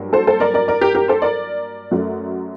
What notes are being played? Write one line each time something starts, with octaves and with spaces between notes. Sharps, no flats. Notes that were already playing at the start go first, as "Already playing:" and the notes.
Already playing: G2 F#3 A#3
A4 C5
A4 C5
A#4 D5
A#4 D5
A#4 D5
G4 A#4
G4 A#4
A4 C5
A#4 D5
F#2 F#3 A3